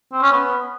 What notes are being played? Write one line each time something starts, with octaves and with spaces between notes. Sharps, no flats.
C4
C#4
B3